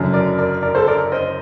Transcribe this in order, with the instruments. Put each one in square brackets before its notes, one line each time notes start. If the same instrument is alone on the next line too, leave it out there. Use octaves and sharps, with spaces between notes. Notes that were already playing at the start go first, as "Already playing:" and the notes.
Already playing: [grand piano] F#1 F#2 D3
[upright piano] A#4 D5
A#4 D5
A#4 D5
A4 C5
A#4 D5
C5 D#5